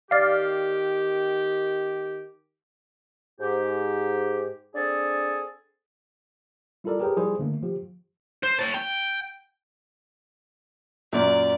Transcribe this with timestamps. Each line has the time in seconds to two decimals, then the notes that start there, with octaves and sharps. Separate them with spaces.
0.11 D#3 G4 D5 F5
3.40 G#2 G4
4.75 C4 D4 G#4 A4
6.84 G3 E4 F4 A4 A#4 D5
7.00 G4 G#4 A#4 B4 C#5 G5
7.17 F3 G3 E4 G#4 C5
7.39 D3 A3 A#3
7.62 D#3 F3 G4
8.43 C5
8.59 C#5 A5
8.74 G5
11.13 F#2 A#2 D5